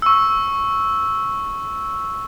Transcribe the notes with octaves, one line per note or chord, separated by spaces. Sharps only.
C#6 E6